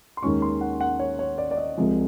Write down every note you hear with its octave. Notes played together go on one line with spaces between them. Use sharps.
C6
D#2 D#3 G#3 C#4 C#6
C6
F#5
F#5
C#5
C#5
D5
D5
D#5
C2 C3 F3 G#3